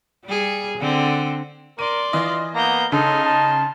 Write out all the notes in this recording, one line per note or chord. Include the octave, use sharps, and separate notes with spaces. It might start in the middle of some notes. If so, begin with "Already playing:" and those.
G3 G#4
D3 C4
A#4 D5 C6 D#7
E3 F4 D#5
A#3 B3 A#5 G6
C#3 D#4 A4 C6
A5